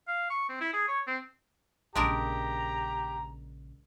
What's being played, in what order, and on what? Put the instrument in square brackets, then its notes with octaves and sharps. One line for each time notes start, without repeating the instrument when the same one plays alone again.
[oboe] F5
C#6
C4
E4
G#4
C#5
C4
[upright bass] A#1 C#3 [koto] G#3 D4 A#4 [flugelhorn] G4 [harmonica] A#5